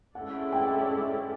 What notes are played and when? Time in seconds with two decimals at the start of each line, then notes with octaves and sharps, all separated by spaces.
0.15 G#3 C#4 E4 A4 D5 F#5
0.53 G5